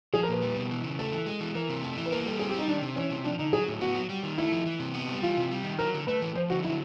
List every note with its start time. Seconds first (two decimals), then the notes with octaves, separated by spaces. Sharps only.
0.14 F3 G#4
0.23 A#4
0.28 A#2 B4
0.42 G3
0.56 B2
0.71 E3
0.84 C#3
0.99 A3 A4
1.12 E3
1.26 G#3
1.40 E3
1.55 E3 A#4
1.69 C3
1.83 A3
1.97 E3
2.06 B4
2.12 A#3 A#4
2.26 G3 A4
2.39 C4 G#4
2.49 G4
2.54 G3 D#4
2.68 D#3 D4
2.82 C3
2.96 E3 C#4
3.11 C3
3.24 F3 D4
3.39 D3 D#4
3.53 F#3 G#4
3.68 A2
3.81 B3 F#4
3.95 F#3
4.09 G3
4.23 D#3
4.38 A3 E4
4.52 F3
4.66 E3
4.80 C3
4.94 B3
5.09 G3
5.23 E3 F4
5.37 C3
5.52 G3
5.64 D#3
5.79 F#3 A#4
5.94 D3
6.07 A3 B4
6.22 E3
6.35 F3 C5
6.50 D3 F#4
6.64 F#3 E4